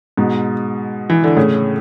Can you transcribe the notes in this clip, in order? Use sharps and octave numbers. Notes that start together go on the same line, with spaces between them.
G#2 B2
E3
D3
A2 C#3